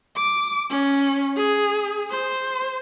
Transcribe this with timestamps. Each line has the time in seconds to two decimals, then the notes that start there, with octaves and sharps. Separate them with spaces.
0.16 D6
0.70 C#4
1.36 G#4
2.10 C5